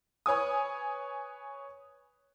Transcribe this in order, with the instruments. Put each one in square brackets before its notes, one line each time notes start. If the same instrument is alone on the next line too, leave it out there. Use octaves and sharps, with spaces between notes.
[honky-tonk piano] B4 C#5 G#5 D#6